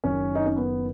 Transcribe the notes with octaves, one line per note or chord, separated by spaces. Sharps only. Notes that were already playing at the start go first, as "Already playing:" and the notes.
F#1 F#2 D#3 C#4
D#4
C#4
B3